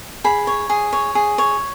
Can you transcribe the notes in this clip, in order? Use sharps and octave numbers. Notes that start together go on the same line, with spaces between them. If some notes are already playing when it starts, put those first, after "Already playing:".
G#4 B5
C#5
G#4
C#5
G#4
C#5